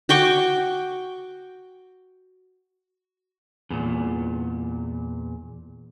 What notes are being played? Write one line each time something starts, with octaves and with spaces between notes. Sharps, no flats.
F#4 G5 C#6 D6
E2 A#2